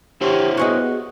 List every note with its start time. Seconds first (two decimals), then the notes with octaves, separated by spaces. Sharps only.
0.21 E4 G4 C5 C#5
0.57 B3 F#4 G#4 D#5